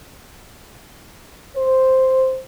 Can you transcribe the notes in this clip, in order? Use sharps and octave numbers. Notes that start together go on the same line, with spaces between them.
C5